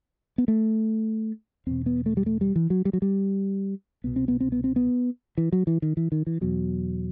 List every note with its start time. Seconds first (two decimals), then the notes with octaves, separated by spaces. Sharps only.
0.38 B3
0.48 A3
1.67 E2 B2 C4
1.86 B3
2.06 A3
2.17 G3
2.26 A3
2.41 G3
2.56 E3
2.70 F#3
2.85 G3
2.93 F#3
3.02 G3
4.04 C2 B2 B3
4.16 C4
4.28 B3
4.40 C4
4.52 B3
4.64 C4
4.76 B3
5.38 E3
5.52 F#3
5.67 E3
5.82 D#3
5.97 E3
6.12 D#3
6.27 E3
6.41 E2 B2 F#3